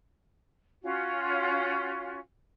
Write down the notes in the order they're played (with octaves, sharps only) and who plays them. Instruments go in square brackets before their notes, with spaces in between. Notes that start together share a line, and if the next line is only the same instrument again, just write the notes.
[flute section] C#4 F4 F#4